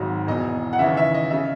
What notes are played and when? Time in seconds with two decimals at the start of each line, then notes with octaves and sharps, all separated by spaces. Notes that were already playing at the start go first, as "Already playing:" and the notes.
Already playing: G#1 G#2 F#3 A#5
0.27 E1 E2 B2 D#5
0.73 F#5
0.79 D#2 C#3 E3 E5
0.97 E5
1.14 D#5
1.31 C#3 E5